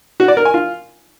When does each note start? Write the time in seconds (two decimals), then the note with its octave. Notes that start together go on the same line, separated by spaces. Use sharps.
0.20 F#4
0.28 D5
0.37 A#4
0.45 G#5
0.54 F4